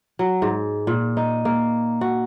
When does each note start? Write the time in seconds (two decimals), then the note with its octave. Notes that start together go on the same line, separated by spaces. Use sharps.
0.19 F#3
0.42 G#2
0.87 A#2
1.17 D#4
1.45 A#3
2.01 F#4